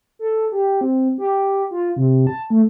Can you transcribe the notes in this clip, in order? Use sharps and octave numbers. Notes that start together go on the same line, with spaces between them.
A4
G4
C4
G4
F4
C3
A5
A3